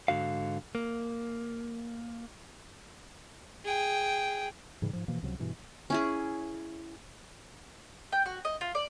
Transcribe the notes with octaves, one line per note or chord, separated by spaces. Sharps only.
G#2 D3 F#4 F5
A#3
G#4 G5
G#2 C#3 E3 G3
G#2 F3
B2 E3 F3 A#3
C#2 C3 F3 F#3
G2 B2 E3
C#4 E4 G#4
G5
F#4
D#5
F4
D5